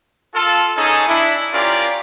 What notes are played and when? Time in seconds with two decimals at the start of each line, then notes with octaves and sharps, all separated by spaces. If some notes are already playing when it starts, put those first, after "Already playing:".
0.34 F4 A4
0.76 C#4 D#4 G#4 A4
1.07 D4 E4
1.53 C#4 F4 G4 A#4 D5